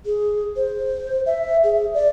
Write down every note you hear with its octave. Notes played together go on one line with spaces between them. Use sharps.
G#4
C5
E5
G#4
D5